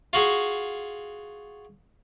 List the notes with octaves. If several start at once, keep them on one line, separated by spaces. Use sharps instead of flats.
F4 F#4 G#4